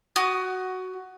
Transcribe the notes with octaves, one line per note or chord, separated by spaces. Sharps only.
F#4 D#6